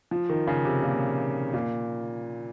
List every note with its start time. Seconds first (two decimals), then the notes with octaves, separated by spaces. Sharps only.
0.11 F3
0.29 D#3
0.48 C#3
0.65 C3
0.83 A#2
1.53 A#2